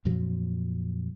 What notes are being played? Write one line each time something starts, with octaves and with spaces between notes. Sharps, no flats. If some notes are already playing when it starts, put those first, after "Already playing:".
F2 A#2 F3 F#3